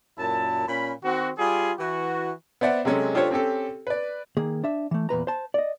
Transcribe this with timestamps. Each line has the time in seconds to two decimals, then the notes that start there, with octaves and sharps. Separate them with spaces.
0.18 F#2 A#2 E4 A5
0.68 A#2 C#4 B5
1.04 D#3 C4 F#4
1.38 G3 F4 G4 G#4
1.79 E3 F#4
2.61 B3 C5 D5 E5 F#5
2.85 C3 F#3 G#3 C#4 A4
3.14 D4 F4 G4 A4 C5 C#5
3.31 C4 C#4 G4 A4
3.87 B4 D5
4.37 D#3 A#3 G#4
4.64 D4 E5
4.91 E3 A3
5.09 E2 A#2 B4 A#5
5.27 C5 A5
5.54 D5 D#5